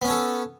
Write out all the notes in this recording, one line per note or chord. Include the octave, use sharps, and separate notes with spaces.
B3 C#4 A4 C#5